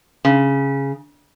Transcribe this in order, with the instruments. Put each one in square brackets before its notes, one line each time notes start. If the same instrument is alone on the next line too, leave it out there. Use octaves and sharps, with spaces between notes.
[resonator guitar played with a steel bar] C#3